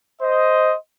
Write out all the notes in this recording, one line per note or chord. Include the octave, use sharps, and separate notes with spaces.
C5 D#5